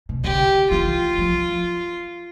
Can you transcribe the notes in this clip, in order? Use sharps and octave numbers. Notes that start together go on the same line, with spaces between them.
B2
D3 G4
E3 F4
F3